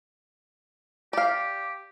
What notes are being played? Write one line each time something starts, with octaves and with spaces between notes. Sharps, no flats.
G4 D5 F5